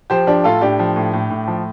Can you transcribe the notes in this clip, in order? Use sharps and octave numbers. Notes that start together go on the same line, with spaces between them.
F3 G4 C5
F3 D4 G4
A2 F4 A4
A2 D4 G4
F3
A2
A2
A2
F3